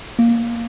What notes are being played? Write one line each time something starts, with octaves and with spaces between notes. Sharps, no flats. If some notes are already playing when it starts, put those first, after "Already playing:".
A#3